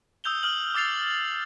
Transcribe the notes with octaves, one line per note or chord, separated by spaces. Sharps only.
D#6 E6 G6 F7 G7
D#6 F6 F#7
D6 E6 A6 C7 F7